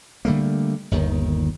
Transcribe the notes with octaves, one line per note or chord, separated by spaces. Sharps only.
D3 G3 A3 A#3
G1 D#2 D#3